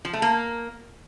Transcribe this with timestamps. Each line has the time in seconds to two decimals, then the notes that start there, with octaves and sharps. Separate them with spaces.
0.05 F3
0.13 A3
0.22 A#3